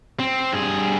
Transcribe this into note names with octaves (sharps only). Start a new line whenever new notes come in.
C4
G2 G#4